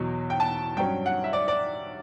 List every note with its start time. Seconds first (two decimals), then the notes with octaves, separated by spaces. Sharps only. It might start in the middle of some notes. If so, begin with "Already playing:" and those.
Already playing: E2 B2 F#3
0.30 G5
0.40 A5
0.77 G2 F#3 C#4 G5
1.06 F#5
1.24 E5
1.33 D5
1.48 D5